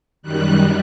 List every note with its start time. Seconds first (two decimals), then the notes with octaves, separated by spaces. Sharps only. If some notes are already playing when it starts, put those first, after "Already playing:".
0.23 F#2 D#3 G3 F#6